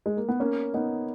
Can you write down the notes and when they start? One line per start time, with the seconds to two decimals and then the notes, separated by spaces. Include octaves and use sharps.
0.06 G#3
0.17 A#3
0.29 B3
0.40 A#3 C#4
0.74 B3 D#4